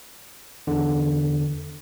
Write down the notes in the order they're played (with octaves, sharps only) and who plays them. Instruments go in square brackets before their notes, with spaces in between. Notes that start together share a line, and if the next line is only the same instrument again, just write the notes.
[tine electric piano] E2 D3